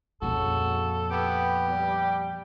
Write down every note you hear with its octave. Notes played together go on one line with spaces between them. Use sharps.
F2 A#2 C#3 F#4 A4
B3 G4
G3